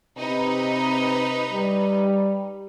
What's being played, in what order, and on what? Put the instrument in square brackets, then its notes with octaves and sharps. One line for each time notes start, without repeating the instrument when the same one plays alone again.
[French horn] C3 [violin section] D#4 B4
[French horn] G3